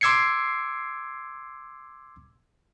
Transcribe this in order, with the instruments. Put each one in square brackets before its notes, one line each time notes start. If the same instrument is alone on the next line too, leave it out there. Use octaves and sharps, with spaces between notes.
[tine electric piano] C6 D6 E6 G#6 C7 C#7